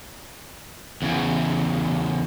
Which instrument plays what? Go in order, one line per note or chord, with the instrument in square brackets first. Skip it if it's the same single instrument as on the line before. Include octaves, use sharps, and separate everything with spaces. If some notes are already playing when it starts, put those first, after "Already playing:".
[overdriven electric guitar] E2 C#3